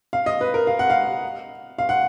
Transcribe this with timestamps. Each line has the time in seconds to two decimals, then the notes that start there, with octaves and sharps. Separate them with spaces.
0.13 F5
0.26 D#5
0.41 B4
0.54 A#4
0.67 F5
0.79 F#5
0.90 F5
1.78 F5
1.89 F#5